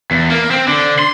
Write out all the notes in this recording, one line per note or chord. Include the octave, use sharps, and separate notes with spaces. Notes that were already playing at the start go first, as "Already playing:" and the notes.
E2
A#3
C4
D3
C6